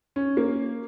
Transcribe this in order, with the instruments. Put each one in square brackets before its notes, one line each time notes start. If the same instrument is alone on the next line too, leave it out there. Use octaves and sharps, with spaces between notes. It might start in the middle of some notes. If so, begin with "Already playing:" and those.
[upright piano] C#4
A#3